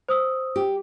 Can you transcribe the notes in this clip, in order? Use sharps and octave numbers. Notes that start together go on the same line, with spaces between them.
C5 D#6 E6
G4